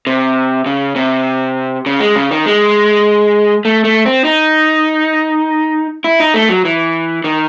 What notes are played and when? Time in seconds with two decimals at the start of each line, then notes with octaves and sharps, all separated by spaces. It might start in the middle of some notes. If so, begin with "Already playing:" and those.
0.07 C3
0.66 C#3
0.96 C3
1.86 C#3
2.00 G#3
2.16 C#3
2.31 D#3
2.46 G#3
3.65 A3
3.84 A3
4.06 C4
4.24 D#4
6.04 E4
6.20 D#4
6.34 A3
6.49 F#3
6.65 E3
7.24 D#3